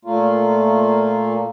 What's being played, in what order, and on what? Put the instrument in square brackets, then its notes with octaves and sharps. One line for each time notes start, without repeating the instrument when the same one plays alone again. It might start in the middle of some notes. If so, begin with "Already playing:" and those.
[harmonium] A#2 A3 A#3 F4